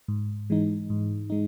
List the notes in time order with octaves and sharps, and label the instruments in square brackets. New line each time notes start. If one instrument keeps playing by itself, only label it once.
[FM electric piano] G#2
E3 G#3 D#4
G#2
G#3 D#4